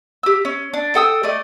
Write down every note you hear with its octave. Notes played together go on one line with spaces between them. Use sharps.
G4 E6
C#4
D4
A4 G5 D#6 E6
A3 D5 D#5